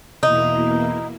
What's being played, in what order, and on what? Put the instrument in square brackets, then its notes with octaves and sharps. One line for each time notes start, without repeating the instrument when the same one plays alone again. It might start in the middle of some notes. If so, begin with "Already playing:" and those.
[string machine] E2 B2 A#3 E4 [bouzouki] D#4